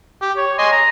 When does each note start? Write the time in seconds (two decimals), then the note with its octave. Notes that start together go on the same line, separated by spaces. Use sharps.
0.22 G4
0.38 C#5
0.59 D#5 G#5 C6
0.72 A#5